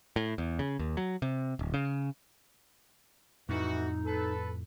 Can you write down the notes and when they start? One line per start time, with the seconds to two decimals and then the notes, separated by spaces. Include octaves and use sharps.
0.16 A2
0.38 E2
0.59 C#3
0.79 D#2
0.97 F#3
1.22 C3
1.59 D1
1.74 C#3
3.49 F2 A2 E3 D#4 F#4
4.06 A4 B4